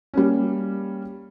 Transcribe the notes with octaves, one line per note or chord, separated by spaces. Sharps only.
G3 A#3 C#4